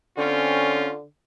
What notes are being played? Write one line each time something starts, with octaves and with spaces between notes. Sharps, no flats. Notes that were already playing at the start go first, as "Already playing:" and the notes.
D3 C4 C#4 F4